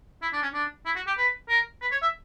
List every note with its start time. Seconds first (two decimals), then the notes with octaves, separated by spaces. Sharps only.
0.22 E4
0.33 D4
0.42 C#4
0.54 D4
0.86 E4
0.96 F#4
1.07 G4
1.17 B4
1.49 A#4
1.81 B4
1.91 C#5
2.02 E5